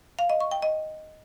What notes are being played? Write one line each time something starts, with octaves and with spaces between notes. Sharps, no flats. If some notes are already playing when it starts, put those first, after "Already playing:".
F5
D#5
C#6
G5
D#5